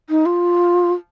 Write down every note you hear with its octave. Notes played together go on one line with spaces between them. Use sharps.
D#4
F4